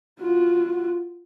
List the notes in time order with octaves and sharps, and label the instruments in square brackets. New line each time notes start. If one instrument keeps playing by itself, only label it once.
[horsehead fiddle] F4 F#4